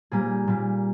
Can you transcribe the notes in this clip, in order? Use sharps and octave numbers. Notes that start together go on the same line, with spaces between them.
A#2 G3 A#3 G#4
A#2 G3 A#3